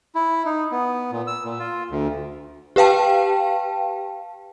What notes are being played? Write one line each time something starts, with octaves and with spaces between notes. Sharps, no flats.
E4
D#4
B3
A#2
E6
A#2
F4
D2
G4 B4 F5 G5 A5